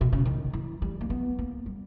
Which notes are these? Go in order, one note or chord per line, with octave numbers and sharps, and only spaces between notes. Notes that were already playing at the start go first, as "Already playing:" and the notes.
B2
C#3
D#3
E3
G3
A#3
B3
A#3
G3